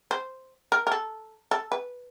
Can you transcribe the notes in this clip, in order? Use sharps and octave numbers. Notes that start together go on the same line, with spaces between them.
C5
A#4
A#4
A4
A4
B4